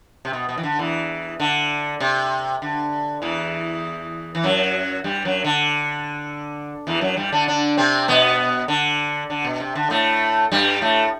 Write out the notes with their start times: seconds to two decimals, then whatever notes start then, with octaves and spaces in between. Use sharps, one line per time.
0.25 C3
0.33 B2
0.49 B2
0.58 E3
0.63 D3
0.79 E2 E3
1.40 D3
2.00 C3
2.62 D3
3.22 E2 E3
4.35 E3
4.44 F#2 F#3
5.04 G2 G3
5.25 F#2 F#3
5.44 D3
6.87 E2 E3
7.01 F#2 F#3
7.17 G2 G3
7.32 D3 D4
7.47 D3 D4
7.77 C3 C4
8.08 B2 B3
8.68 D3
9.30 D3
9.44 B2
9.60 C3
9.75 D3
9.90 A2 A3
10.52 G2 G3
10.81 A2 A3